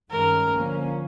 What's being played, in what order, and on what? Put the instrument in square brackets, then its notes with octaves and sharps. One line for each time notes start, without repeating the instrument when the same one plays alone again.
[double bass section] G2 D#3 G#3 C#4 [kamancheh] A#4
[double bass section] D3 F3 A#3 C#4